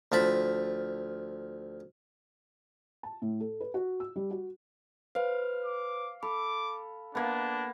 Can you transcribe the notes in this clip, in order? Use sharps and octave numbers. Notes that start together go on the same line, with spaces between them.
D2 F3 A5 B5
A5
A2
A4
B4
F#4
E6
G3
F#4
B4 C5 F5
D6
A4 B5 D6
A#3 B3 D4